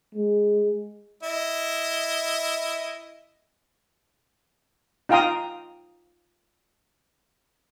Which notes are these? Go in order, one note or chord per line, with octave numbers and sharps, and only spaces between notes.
G#3
E4 D#5
D#4 F4 F5 G5 A#5 D#6